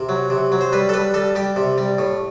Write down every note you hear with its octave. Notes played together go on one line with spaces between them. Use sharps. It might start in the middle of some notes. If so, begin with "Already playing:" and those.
Already playing: C3
F#3
C3
F#3
C5
G3 B4
A4
G3 B4
G3 A4
G3 G4
C3
G3
A2